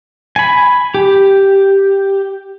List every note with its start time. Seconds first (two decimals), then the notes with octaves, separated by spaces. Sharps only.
0.36 G#5 B5
0.94 G4